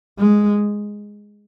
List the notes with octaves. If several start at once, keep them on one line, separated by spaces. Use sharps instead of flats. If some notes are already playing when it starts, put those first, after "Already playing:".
G#3